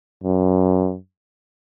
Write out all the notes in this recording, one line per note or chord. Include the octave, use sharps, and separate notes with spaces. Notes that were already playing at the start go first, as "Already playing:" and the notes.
F#2